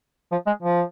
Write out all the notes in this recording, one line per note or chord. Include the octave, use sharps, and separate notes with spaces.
F3
G#3
F3